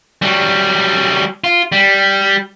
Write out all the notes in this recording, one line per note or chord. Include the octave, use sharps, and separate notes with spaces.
F#3 G3
F4
G3